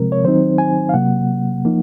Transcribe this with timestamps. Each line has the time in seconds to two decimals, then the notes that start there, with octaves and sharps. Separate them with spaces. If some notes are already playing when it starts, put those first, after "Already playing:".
Already playing: C3 F3 G#3 C4 A#4
0.12 C#5
0.24 D#3 F#3 C4 D#4 C5
0.58 G#5
0.89 F5
0.94 C3 F#3 A#3 F#5
1.65 F3 A#3 D#4